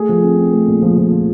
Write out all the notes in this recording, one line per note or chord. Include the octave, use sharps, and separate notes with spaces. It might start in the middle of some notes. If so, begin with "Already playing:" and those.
Already playing: A3 G#4
F3
C4
C4
A3
A#2
F3
F3
F3